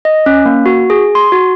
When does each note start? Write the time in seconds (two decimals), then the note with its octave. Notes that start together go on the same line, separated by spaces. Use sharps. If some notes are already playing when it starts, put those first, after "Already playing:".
0.05 D#5
0.26 C#4
0.46 A#3
0.66 F#4
0.90 G#4
1.15 C6
1.32 F#4